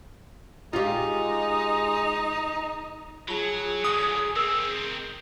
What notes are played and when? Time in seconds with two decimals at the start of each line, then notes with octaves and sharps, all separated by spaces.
0.73 G#3 D#4 F4 G4
3.28 F#3 F4 G#4 A5
3.84 D3 F#3 D#6
4.36 C4 D#4 A#4